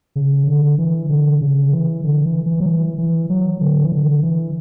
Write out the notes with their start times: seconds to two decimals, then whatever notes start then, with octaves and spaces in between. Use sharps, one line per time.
0.16 C#3
0.47 D3
0.78 E3
1.09 D3
1.41 C#3
1.73 E3
2.04 D3
2.25 E3
2.46 E3
2.60 F#3
2.66 E3
2.98 E3
3.30 F#3
3.61 D3
3.84 E3
3.92 D3
4.23 E3